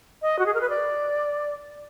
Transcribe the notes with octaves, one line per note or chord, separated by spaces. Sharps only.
D#5
F#4
G#4
A#4
B4
D5